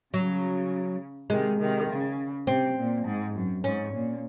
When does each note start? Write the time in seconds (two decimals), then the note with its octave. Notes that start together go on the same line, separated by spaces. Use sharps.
0.14 C#3 F#3
1.30 C3 D#3 G#3
1.59 C3 D#3
1.89 C#3
2.47 C3 C4
2.77 A#2
3.05 G#2
3.35 F#2
3.64 G#2 C#4
3.93 A#2